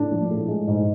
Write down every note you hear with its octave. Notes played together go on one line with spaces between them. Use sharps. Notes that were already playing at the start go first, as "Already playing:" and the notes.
Already playing: A2 D4
F3
A2
G#3
G#2